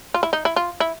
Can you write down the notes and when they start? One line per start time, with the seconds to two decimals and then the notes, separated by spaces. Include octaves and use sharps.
0.14 F4
0.23 E4
0.33 D#4
0.45 E4
0.56 F4
0.80 E4